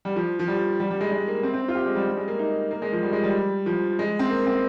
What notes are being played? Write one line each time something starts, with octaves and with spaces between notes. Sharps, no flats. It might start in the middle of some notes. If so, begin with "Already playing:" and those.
G3
F3
F3
G3
G3
G3
G#3
G#3
A#3
C4
C4
F4
G4
G#3
G3
G3
G#3
A#3
D#4
A#3
G#3
F3
G3
G#3
G3
F3
G#3
C4
A#3
C4